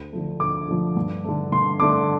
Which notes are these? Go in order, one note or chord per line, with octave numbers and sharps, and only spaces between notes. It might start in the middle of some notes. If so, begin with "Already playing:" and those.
Already playing: D2
D3 F3 A3
D2 D6
D3 F3 A3
G2
D3 A3
G2 C6
D3 A3 D6